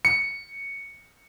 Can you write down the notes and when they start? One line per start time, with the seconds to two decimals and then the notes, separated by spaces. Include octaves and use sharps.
0.05 C#7